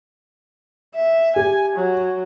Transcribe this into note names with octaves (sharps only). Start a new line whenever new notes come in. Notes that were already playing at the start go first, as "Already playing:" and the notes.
E5
G4 G#5
F#3